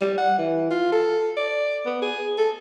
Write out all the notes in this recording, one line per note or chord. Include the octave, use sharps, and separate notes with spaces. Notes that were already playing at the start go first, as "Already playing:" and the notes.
G3
F#5
E3
F4
A4
D5
B3
G#4
A4